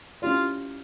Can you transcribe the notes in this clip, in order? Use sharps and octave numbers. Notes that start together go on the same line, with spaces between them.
C#4 E4 F4 G4 D5